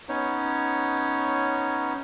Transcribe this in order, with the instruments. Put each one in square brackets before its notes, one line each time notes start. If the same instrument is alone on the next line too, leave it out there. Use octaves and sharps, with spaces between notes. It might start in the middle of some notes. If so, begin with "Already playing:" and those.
[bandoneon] B3 C#4 D#4 C#5